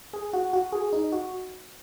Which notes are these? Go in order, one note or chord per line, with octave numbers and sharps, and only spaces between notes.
G#4
F#4
F#4
G#4
D#4
F#4